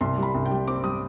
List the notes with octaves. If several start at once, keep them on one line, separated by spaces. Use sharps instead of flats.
C2 C6
G3 B5
C2
G5
G3
C4 D6
G3 D#6